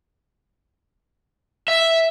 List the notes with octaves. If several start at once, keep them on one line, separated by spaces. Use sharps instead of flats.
E5